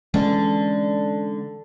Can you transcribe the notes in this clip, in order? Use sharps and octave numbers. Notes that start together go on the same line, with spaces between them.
D3 E3 G#3 C#4